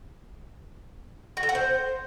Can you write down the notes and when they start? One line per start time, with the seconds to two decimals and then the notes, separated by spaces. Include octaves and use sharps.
1.37 F#4
1.43 A4
1.49 F#5
1.55 C5